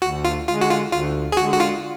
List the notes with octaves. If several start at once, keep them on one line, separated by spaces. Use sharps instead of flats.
D2 F#4
F4
D3 G#3 F4
F#4
F4
D2 F4
G#4
D3 G#3 F#4
F#4
F4